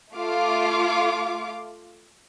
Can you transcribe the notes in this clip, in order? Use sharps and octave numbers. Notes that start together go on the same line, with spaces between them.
A3 F4 F5 D6